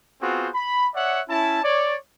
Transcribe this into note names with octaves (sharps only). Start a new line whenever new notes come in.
B3 C4 F4 F#4 G#4 C5
B5
C#5 D5 E5 F#5
C#4 E4 A5
C#5 D5